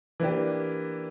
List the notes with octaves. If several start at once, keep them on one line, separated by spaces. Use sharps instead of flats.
E3 A#3 D4 G4